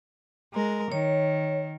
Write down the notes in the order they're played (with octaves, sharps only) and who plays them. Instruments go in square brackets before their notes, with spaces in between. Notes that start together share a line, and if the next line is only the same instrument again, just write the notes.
[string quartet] G#3 A#4
[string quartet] D#3 [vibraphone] C#5